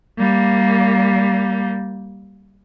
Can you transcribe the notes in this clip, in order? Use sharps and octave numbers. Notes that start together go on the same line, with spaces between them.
G3 A#3